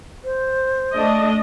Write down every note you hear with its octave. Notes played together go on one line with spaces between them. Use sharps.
C5
A3 D4 D#5